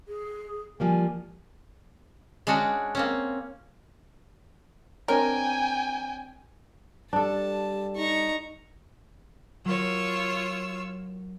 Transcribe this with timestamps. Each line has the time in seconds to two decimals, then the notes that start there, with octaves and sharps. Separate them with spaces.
0.08 G#4
0.80 F3 G3 A#3 G#5
2.47 G#3 C#4 D4 F#4
2.95 A#3 C4 C#4
5.08 C4 D4 A#4 C#5 G5 G#5
7.13 G3 D4 A4 A5
7.97 D#4 A#5 C#6
9.65 F#3 F4 A#4 C#5 E6